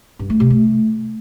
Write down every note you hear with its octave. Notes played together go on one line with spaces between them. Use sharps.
G2
A3
C3
A3